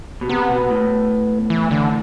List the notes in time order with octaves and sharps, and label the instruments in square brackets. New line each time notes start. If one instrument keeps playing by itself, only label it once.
[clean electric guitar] B2
[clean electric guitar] C3 [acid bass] B3
[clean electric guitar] B2
A2
[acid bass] E3
D3